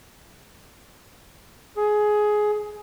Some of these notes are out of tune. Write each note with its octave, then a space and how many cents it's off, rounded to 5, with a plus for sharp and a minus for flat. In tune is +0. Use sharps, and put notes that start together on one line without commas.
G#4 +15